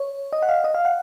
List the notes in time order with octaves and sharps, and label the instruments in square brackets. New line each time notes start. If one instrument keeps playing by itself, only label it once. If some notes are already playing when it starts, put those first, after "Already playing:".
Already playing: [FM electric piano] C#5
D#5
F#5
F5
D#5
F5
F#5